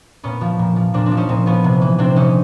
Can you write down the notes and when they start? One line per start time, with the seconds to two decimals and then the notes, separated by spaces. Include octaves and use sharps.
0.23 A#2 B3 C#4
0.41 F3
0.59 A#2
0.76 F3
0.94 A#2 C4 D4
1.06 C4 D4
1.12 F3
1.17 C#4 D#4
1.29 A#2 C4
1.46 F3 B3 C#4
1.64 C3
1.81 E3
1.98 C3 C4 D4
2.16 E3 C#4 D#4